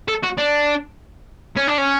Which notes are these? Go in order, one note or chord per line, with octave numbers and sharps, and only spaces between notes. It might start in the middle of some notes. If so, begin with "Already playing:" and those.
A4
F#4
D4
C#4
D4
C#4